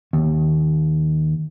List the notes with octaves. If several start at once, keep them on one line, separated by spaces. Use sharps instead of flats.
D#2